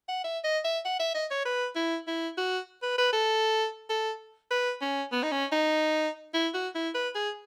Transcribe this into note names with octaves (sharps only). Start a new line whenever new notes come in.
F#5
E5
D#5
E5
F#5
E5
D#5
C#5
B4
E4
E4
F#4
B4
B4
A4
A4
B4
C#4
B3
D#4
C#4
D#4
E4
F#4
E4
B4
G#4